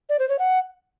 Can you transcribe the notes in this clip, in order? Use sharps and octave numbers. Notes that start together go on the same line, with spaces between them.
D5
C5
C#5
F#5